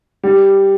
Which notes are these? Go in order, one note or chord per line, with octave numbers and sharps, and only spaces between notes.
G3